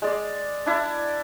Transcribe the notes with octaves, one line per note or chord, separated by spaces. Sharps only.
G#3 D5
D4 E4